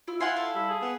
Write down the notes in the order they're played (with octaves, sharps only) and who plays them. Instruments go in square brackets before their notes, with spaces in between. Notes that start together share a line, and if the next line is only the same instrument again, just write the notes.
[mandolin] E4 [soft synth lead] F4
[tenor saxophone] E4 [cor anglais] F4 [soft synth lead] F5 [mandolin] F#5 G#5 C6
[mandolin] A4
[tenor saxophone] G3 [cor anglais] E4
[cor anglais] G#4
[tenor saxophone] B3